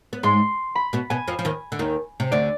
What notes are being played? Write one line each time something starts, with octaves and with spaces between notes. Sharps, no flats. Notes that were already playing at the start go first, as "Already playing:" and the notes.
B3
G#2 G#3 C6
B5
B2 B3
B2 B3 G#5
F2 F3
F3
D#2 D#3
D3
D#2 D#3
C3
D2 D3 D5